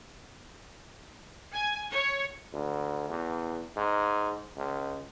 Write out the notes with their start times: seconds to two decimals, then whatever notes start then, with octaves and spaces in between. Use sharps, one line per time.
1.53 G#5
1.91 C#5
2.53 D2
3.09 E2
3.76 G#2
4.56 C#2